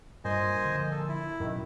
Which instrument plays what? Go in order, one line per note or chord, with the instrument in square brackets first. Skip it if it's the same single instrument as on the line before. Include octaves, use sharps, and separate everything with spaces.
[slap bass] G2 [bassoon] A#2 [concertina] C5 D#5 G#5
[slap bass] D3 F3
[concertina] A4
E4
[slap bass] F#2 B2 [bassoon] D#3